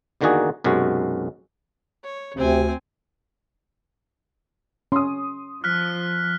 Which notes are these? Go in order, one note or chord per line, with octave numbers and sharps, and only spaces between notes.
E2 D3 D#3 A#3 F#4 G#4
B1 F#2 C3 G#3 F#4
C#5
D2 C3 C4 G#5
C#4 C6 D#6
F3 F6 F#6 B6